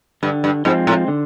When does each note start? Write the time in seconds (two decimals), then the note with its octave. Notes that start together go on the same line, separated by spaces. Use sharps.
0.23 G2 D3
0.44 G2
0.65 G#2 F3 G#3 C4
0.87 A2
1.08 D3